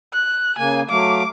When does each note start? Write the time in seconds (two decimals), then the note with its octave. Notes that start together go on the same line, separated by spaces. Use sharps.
0.13 F#6
0.58 C#3 A#3 G#5
0.90 F#3 A3 F5 D6